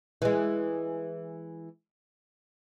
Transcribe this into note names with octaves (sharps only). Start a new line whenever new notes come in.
E3 G#3